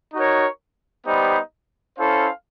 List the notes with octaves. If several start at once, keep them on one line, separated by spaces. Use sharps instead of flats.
D#4 F#4 A#4 C#5
G3 B3 D#4 G4 C5
C#4 E4 A4 C5 F5